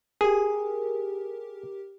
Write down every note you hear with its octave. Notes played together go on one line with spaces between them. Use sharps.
G4 G#4 A#4